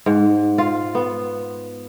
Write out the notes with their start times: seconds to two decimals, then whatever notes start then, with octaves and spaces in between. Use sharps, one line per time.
0.06 G#2
0.58 F4
0.95 B3